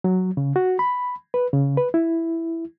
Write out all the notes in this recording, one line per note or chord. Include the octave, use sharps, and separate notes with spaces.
F#3
C#3
F#4
B5
B4
C#3
B4
E4